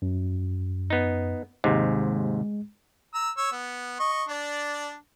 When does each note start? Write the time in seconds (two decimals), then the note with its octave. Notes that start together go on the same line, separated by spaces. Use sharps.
0.02 F#2
0.90 B3 D#4
1.64 D#2 G#2 C3 G#3
3.14 A#5 E6
3.37 C#5 E6
3.52 B3
4.00 D#5 C#6
4.29 D4 D5